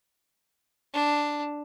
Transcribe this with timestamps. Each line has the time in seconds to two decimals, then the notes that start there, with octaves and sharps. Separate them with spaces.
0.94 D4